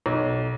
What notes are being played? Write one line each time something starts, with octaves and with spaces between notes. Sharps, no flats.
B1